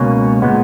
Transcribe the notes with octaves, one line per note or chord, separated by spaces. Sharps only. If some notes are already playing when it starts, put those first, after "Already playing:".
Already playing: C#2 B2 A#3 C#4
A#2 G#3 B3